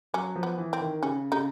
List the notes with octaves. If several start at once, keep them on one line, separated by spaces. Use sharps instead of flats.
F#3 C#4
F3
B3
E3
C4
D#3
C#3 C#4
C#3 D#4